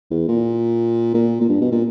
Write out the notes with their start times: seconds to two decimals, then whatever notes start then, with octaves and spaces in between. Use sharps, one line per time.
0.11 E2
0.28 A#2
1.14 A#2
1.41 A#2
1.49 G2
1.61 B2
1.72 A#2